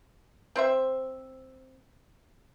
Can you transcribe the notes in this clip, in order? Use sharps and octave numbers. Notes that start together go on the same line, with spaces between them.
C4 C5 E5